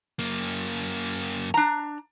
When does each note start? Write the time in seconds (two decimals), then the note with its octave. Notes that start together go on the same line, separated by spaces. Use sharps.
0.19 F#2 A#3
1.54 D4 A#5